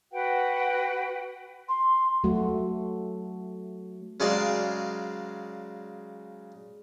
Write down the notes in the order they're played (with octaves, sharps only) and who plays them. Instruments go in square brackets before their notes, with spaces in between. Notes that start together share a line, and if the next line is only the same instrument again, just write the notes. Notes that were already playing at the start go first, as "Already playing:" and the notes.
[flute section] F#4 B4 F#5 G5
[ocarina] C6
[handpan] F#3 A3 F#4
[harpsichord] C#3 F#3 G#3 G#4 D5 F5